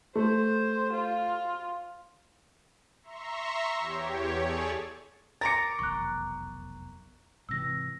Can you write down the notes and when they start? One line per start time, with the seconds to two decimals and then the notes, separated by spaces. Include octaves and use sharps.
0.16 A3 C5
0.92 F4
3.03 E5 A#5 C6 C#6
3.78 E2 G4 C#5
4.37 G#4 A4 C#5 D5
5.41 A#4 A#5 D6 A6 C#7
5.79 F1 B1 E2 C#6 F#6
7.49 G#2 C3 E3 E6 A#6